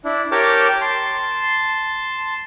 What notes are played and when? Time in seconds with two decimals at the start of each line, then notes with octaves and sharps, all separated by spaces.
0.04 D4 E4
0.32 G4 A#4 C#5 G5 A5 D6
0.82 A5 C6